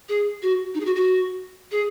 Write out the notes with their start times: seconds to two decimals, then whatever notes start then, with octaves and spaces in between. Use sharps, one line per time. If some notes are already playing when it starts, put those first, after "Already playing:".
0.09 G#4
0.42 F#4
0.74 D#4
0.80 G#4
0.85 F#4
0.96 F#4
1.72 G#4